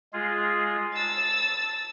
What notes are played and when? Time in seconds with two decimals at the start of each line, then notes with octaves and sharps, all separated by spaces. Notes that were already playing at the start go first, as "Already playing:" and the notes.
0.13 G#3 F4 G#4
0.94 A5 E6 A6